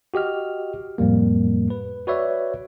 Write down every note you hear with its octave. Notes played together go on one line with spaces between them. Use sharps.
F#4 G4 D#5 F6
F2 A2 G3 A#3
B4
F#4 B4 C#5 D5 E5